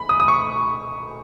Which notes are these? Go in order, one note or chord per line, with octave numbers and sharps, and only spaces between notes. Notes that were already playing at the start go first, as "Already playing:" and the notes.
Already playing: B5
D#6
D#6
C#6